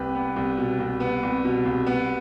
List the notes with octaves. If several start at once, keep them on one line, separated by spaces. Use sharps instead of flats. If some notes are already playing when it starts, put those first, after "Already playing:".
Already playing: C2 G4 B4
B3
C2
B2
C2
B3
C2
B2
C2
B3